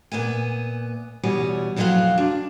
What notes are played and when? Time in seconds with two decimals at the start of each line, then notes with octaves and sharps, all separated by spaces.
0.12 A#2 B3 E5 G#5
1.23 E2 B2 G3 C#5 G#5
1.76 F2 B2 F#3 E4 F4 F5
2.18 D4